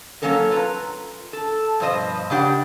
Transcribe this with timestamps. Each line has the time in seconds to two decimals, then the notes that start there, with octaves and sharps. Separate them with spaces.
0.22 F#3 A#3 C#4 A4 A#4
0.51 F4 B4 A#5
1.33 A4
1.80 G2 B2 F3 C5 D#5
2.30 C#3 D4 G4 C#5 D5 F#5